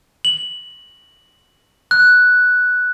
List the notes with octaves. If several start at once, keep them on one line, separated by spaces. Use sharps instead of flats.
F#7
F#6